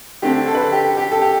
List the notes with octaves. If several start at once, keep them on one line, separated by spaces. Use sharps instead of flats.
D3 A3 C4 G4
A4
B4
A4
G4
G4
A4
G4